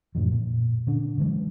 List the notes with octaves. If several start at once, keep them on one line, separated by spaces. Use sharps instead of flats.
F#2 A2 D3 F3
A#2
D3 C#4 D4
D3 E3 F#3 G#3